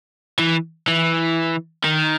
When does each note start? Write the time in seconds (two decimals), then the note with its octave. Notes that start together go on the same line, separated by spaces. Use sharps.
0.39 E3
0.88 E3
1.84 D#3